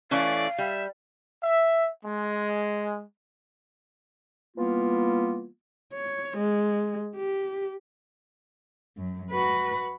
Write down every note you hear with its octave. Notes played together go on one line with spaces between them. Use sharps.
E3 A3 C#4 D5 F5
G3 E5
E5
G#3
E3 G3 A#3 B3 F4
C#5
G#3
G4
F#2
F#4 B4